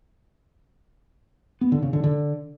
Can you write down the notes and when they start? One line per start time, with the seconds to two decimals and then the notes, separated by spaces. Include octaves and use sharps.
1.61 B3
1.72 D3
1.82 C#3
1.93 D3
2.04 D3